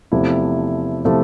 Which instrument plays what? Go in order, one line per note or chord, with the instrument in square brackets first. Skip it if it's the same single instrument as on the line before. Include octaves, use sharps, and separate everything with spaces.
[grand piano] E2 C3 F3 A3 E4
C3 F3 A3 E4